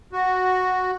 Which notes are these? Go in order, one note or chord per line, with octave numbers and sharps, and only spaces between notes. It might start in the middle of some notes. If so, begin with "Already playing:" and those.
F#4